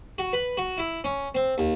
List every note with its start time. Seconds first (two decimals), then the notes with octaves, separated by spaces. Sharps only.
0.18 F#4
0.33 B4
0.57 F#4
0.78 E4
1.04 C#4
1.35 C4
1.58 D#2